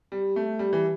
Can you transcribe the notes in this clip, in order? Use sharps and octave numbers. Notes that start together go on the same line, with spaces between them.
G3
A3
G3
E3